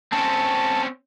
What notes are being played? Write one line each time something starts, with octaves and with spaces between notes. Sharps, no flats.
C4 C#4 A5